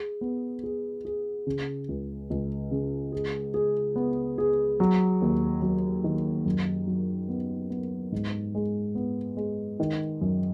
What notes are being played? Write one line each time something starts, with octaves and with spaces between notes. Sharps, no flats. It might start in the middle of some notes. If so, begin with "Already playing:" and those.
Already playing: G#4
B3
G#4
G#4
C#3
C#2
C#2
C#3
G#4
G#4
B3
G#4
F#3
D#2
F#3
D#3
F#2
F#3
B3
B3
G#2
G#3
B3
G#3
D#3
F#2